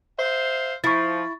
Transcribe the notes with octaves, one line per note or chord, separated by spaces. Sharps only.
C5 E5 F5
F3 E4 C#6 A6